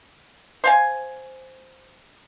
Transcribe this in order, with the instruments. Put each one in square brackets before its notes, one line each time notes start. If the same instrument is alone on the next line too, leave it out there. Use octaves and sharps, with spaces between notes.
[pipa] C5 F5 G#5